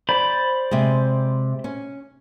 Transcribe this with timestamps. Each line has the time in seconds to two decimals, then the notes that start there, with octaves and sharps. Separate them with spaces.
0.09 C5 D5 B5
0.71 C3 G#3
1.64 C#4